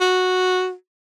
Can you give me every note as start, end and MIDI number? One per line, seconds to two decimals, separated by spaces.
0.01 0.73 66